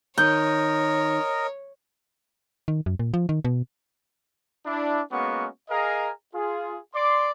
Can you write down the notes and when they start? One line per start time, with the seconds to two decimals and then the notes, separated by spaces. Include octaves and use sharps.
0.18 D#3 A#4 C#5 D#5 G6
2.68 D#3
2.86 F#2
2.99 A#2
3.14 F3
3.29 D#3
3.45 B2
4.66 D4 E4
5.12 G#3 A#3 B3 C#4 F#4 C#6
5.70 G#4 A#4 D#5 F5 G#5 A#5
6.34 F4 G#4
6.95 D5 C6 D6